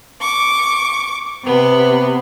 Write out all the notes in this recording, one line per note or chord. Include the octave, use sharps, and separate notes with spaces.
C#6 D6
C3 B3